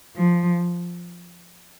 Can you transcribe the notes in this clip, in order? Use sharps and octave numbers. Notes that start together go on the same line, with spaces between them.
F3